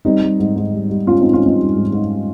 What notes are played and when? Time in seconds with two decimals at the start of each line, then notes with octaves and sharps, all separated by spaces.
0.05 G3 C4 D#4
0.22 G3
0.40 G#2
0.56 G#2
0.74 G3
0.90 G3
1.07 G#2 C#4 F4
1.20 C4 D#4
1.24 G#2
1.33 C#4 F4
1.42 G3 C4 D#4
1.59 G3
1.76 G#2
1.93 G#2